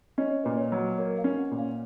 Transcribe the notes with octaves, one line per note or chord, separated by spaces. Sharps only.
C#4 D#5
C#5
A#2 B4
C#5
F#3
A#3 C#5
F5
C#4
F#5
A#2
F5